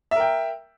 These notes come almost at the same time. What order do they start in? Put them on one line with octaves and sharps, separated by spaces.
E5 A#4 G5